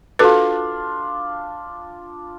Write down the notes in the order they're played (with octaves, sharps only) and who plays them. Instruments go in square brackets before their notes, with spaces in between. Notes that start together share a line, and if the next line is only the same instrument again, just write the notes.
[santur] D4 F4 [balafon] F#4 A4 B4